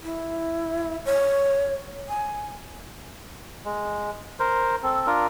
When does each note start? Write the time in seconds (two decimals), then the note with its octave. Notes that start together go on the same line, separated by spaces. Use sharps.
0.04 E4
1.06 C#5
2.09 G#5
3.65 G#3
4.40 A#4 C5
4.83 C4 A4
5.07 D4 F4 A#4